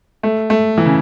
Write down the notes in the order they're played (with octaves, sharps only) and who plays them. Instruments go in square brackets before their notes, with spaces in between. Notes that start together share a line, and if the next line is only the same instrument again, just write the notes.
[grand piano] A3
A3
E3
C#3